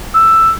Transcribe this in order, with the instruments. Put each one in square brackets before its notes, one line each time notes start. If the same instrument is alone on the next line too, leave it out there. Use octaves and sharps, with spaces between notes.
[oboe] E6